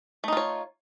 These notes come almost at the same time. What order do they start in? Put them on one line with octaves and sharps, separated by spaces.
A3 D#4 F4 C#5